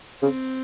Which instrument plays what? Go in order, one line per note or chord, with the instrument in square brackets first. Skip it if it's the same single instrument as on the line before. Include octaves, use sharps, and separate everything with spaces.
[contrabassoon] C#3 [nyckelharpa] C4